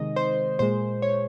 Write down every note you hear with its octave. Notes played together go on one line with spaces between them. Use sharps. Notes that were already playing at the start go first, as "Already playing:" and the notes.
Already playing: C3 D#3 G#3 D#5
C5
A#2 G#3 C5
C#5